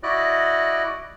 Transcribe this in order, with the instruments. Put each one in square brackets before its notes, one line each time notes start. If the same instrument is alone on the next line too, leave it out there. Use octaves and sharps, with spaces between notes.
[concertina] E4 F#4 D5 D#5 F#6